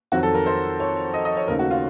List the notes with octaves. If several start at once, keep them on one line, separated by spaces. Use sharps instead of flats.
F2 D#3 F#3 C4 F#4
A4
A#4
C5
C#5
D#5
D#5
C#5
D#2 C#3 A3 D#4 A#4
F#4
F4